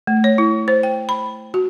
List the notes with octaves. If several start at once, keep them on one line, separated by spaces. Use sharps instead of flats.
A3
C#5
E4
C5
G5
B5
F#4